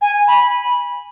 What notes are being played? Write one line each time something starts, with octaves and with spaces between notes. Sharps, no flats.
G#5
B5